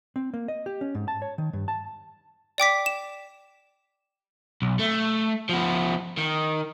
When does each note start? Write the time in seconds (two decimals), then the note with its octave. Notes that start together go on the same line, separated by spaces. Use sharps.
0.16 C4
0.34 A#3
0.48 D#5
0.66 G4
0.81 C#4
0.95 G#2
1.08 A5
1.22 C#5
1.38 D#3
1.53 G2
1.68 A5
2.58 D5 G5 D6 B6
2.86 E7
4.62 B1
4.79 A3
5.49 F3 B3
6.18 D#3